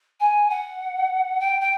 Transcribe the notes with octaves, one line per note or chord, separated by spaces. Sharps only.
G#5
F#5
G5
G5